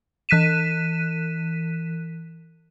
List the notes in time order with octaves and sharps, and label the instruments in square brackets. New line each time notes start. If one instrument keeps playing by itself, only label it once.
[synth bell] E3 F#6 B6 D#7 E7